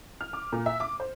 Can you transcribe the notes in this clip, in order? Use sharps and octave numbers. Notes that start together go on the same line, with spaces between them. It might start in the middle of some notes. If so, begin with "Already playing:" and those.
F6
D6
A#2
E5
D6
C5